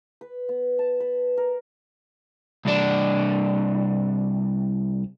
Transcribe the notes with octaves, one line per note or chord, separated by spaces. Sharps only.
B4
B3
A5
B4
A#4
C2 D4